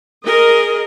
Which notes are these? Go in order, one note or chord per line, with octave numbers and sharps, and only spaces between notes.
G#4 A#4 D#5